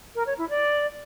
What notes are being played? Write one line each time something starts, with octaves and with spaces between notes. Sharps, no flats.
A#4
C#5
E4
D5